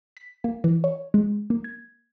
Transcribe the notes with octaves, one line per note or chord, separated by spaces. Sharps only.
B6
A#3
E3
C#5
G#3
A#3
G#6